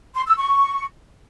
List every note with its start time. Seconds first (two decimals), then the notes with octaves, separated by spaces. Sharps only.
0.14 C6
0.26 E6
0.38 C#6